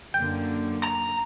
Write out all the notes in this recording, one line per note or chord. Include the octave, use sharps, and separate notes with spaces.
F#2 D3 A#3 G5
A#5